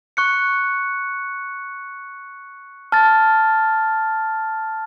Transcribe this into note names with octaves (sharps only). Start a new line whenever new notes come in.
C#6 F#6 C#7
A5 F6 A6